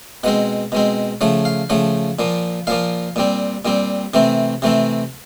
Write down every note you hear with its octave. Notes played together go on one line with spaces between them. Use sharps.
B2 G#3 C4 F#5
B2 G#3 C4
C#3 F3 A3 F#5
F5
C#3 F3 A3 F#5
A#2 F3 A#3
A#2 F3 A#3 F5
A#2 G3 C4
A#2 G3 C4
C3 E3 A3 C4
C3 E3 A3 C4